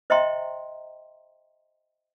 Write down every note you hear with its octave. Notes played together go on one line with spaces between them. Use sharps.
C5 D#5 E5 G5 A#5 C6